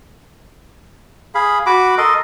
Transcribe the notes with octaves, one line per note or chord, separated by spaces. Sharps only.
G#4 F5 B5
F#4 B5 D6
A4 A#4 D#5 C6